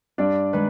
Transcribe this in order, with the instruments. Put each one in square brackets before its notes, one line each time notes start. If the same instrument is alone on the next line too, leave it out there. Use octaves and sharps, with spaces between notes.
[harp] G2 [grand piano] D4 D5
[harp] D#3 G#3 [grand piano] B4